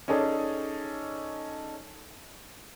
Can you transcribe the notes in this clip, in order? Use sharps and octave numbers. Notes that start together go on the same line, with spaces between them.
C#4 D#4 G#4 A4 D5